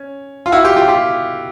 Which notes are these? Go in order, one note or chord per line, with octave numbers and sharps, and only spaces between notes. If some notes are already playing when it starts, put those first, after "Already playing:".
Already playing: C#4
F4
E4 F#4
F4 G4
F4 G4
F4 G4